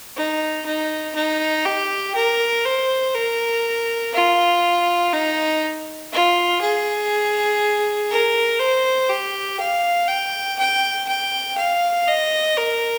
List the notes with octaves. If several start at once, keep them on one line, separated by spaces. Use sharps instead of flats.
D#4
D#4
D#4
G4
A#4
C5
A#4
F4
D#4
F4
G#4
A#4
C5
G4
F5
G5
G5
G5
F5
D#5
A#4